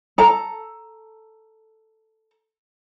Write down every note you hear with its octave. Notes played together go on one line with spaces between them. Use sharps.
A4 A#5